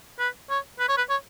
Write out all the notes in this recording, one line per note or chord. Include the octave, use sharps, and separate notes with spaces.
B4
C#5
B4
C#5
B4
C#5